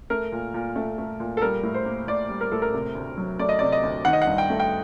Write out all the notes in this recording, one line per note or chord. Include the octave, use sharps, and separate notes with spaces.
A3 A#4
A#2
A#2
A3
A3
A#2
A4
G3 A#4
A2
C5
A#3
A2 D5
G3
A#4
A2 A4
A#4
C3
D2
F#3
A3 D5
D#5
C3 D5
D#5
D2
D#3 F#5
D#5
F#5
G2
G5
A3
G5